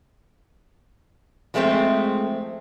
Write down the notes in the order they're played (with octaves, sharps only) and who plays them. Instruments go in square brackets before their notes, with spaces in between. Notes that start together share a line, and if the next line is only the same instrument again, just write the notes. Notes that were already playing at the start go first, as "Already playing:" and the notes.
[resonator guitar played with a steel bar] F3 G#3 A3 B3 C4